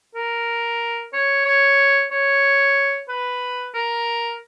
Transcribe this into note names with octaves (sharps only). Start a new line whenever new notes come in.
A#4
C#5
C#5
C#5
B4
A#4